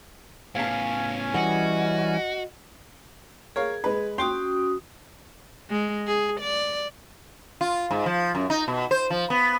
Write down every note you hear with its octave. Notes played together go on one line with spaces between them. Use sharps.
A2 B3 C#4 F5 G#5 A5
E3 G3 F#4 D#5 F#5
G#4 A#4 C#5 F5
G#3 B4
C#4 F#4 G5 C6 D#6
G#3
G#4
D5
F4
G#2
F3
F#2
D#4
B2
C5
F3
B3